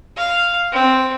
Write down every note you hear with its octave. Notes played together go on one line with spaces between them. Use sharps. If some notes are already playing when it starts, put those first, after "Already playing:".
F5
C4